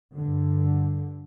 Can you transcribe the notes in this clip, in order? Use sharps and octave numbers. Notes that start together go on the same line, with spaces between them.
G2 D3